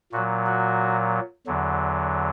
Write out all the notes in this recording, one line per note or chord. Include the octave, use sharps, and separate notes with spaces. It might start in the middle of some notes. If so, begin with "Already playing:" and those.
A#2 F#3 F#4
F#4
E2 D3 F#3